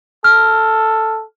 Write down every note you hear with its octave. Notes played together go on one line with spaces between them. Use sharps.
A4 F6